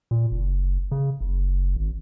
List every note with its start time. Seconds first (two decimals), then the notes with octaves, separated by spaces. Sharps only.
0.11 A#2
0.31 F#1
0.92 C#3
1.21 F#1
1.76 G#1